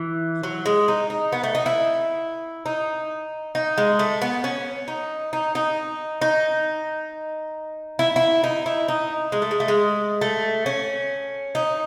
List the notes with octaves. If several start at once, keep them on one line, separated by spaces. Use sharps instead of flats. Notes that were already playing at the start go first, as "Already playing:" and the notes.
Already playing: E3
F#3
G#3
D#4
D#4
B3
A3
D#4
E4
D#4
D#4
G#3
A3
B3
C#4
D#4
D#4
D#4
D#4
E4
E4
D#4
E4
D#4
G#3
A3
G#3
A3
G#3
A3
C#4
D#4